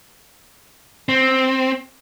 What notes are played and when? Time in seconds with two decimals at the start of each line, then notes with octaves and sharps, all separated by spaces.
1.09 C4